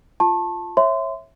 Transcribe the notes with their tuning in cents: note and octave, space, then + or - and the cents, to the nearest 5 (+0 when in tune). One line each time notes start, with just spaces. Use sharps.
F4 +0 A5 +0 C#6 -40
C#5 -25 E5 +0 C6 -25